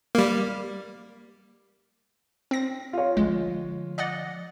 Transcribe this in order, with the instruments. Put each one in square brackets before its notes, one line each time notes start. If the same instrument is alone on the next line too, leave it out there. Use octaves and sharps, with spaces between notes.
[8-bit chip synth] G3 A#3
[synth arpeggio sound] C4 A#6
[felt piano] F4 C#5
[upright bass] D3 F3 [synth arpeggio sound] G#3
[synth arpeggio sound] D5 D#5 F#5